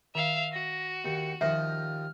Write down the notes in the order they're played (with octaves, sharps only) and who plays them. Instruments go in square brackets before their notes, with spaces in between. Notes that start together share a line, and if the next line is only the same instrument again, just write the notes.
[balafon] D#3 [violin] E5 F5 [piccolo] F7
[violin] F#4 [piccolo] A#6
[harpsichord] D#2 [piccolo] C#7
[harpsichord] D#2 F3 D#5 [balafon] E5 [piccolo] F6